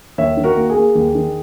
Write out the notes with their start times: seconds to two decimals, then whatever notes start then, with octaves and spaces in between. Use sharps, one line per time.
0.18 D#2 C#5 E5
0.37 D#3
0.44 F#4 A#4
0.57 A#3
0.70 G#4
0.76 A#3
0.95 D#2
1.15 D#3